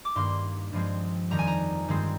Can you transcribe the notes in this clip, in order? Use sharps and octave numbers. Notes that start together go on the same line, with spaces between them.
D6
G2 D#3 A#3 C6
G2 F3 G#3 C4
F2 D#3 G3 A#5
G#5
A#5
G2 D#3 G#3 C4